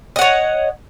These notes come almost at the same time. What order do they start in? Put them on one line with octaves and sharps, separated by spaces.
D#5 F#5 C#5